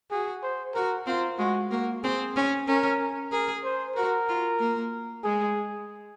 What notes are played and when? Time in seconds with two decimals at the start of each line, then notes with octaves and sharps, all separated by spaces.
0.11 F#4 G#4
0.43 C5
0.74 F#4 A#4
1.07 C4 F4
1.39 G#3 F#4
1.71 A#3 F#4
2.04 C4 G#4
2.36 C#4
2.67 C#4 A#4
3.32 G#4 A#4
3.64 C5
3.96 F#4 A#4
4.29 F4
4.59 A#3
5.24 G#3 G#4